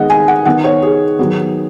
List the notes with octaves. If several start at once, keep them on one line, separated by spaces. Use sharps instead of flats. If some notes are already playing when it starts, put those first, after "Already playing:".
Already playing: D#3 G#3 B3 D#5 F#5
G#5
F#5
D#3 B3 F#5
C#5
G#4
D#3 F#3 B3